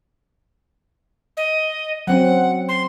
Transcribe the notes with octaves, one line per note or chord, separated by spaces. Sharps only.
D#5
F#3 C4 C#4 F#5
C6